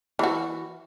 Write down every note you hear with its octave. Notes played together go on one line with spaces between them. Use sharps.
E3 F#4